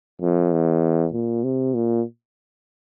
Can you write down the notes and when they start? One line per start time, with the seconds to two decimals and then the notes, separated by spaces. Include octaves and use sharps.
0.21 F2
0.52 E2
1.13 A#2
1.44 C3
1.74 A#2